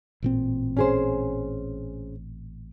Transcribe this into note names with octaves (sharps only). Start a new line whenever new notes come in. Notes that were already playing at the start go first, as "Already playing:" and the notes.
A1 A#2 C4
C#4 G#4 C5